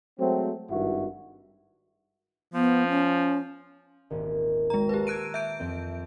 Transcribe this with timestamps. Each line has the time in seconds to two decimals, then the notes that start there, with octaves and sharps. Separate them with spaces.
0.19 F#3 G#3 A3 C4
0.70 G#1 G2 D#3 E4 F#4
2.54 F3 B3
2.89 C#4
4.10 D#1 G#1
4.70 G#3 A#5
4.89 G4 B4 A5 A#5
5.07 A#5 E6 F#6 G#6 D7 D#7
5.34 E5 G6 D7
5.60 F2 C4